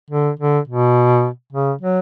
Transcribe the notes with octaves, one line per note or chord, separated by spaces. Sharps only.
D3
D3
B2
C#3
F#3